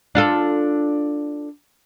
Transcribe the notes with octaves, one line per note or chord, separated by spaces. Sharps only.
D4 F4 A4